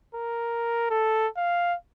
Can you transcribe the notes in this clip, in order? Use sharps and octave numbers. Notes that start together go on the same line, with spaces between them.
A#4
A4
F5